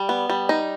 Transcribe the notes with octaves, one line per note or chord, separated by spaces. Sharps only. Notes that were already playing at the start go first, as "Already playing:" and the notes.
Already playing: G3
B3
G3
D#4